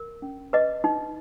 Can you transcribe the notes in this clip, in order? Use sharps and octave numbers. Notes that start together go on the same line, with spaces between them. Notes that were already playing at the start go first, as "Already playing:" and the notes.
Already playing: A#4
C#4
B4 D#5
D#4